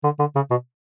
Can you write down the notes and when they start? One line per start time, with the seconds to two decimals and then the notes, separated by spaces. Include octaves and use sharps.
0.04 D3
0.19 D3
0.36 C#3
0.50 B2